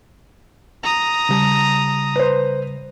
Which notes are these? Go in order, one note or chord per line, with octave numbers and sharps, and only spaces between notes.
A#5 D#6
C#3 G3 A5
B4 C5